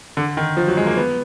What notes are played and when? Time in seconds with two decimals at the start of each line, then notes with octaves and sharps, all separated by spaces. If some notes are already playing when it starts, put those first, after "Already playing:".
0.17 D3
0.37 D#3
0.57 F3
0.68 F#3
0.77 G#3
0.87 A#3
0.97 B3